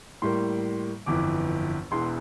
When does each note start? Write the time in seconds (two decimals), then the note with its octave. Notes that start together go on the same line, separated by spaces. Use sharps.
0.22 A2 G3 A#3 C6
1.06 G1 F2 E3 D6
1.91 E1 E2 E3 C6